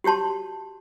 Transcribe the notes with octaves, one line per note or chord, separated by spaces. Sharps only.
F#4 G4 C#5 A5 C6